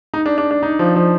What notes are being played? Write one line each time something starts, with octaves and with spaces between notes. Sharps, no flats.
D#4
D4
D4
D4
D#4
F3
F3